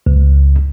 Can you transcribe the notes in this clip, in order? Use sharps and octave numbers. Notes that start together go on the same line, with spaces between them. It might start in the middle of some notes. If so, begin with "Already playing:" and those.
C#2